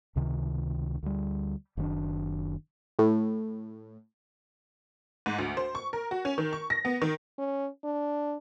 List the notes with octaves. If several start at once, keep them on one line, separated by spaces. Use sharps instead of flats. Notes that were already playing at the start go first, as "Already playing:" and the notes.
C#2 C3 D#3
D2 G3
F#1 D#3 C4 D4
A2
G#2
D2
C5
C#6
A#4
F#4
C#4
D#3
C#6
A#6
B3
D#3
C#4
D4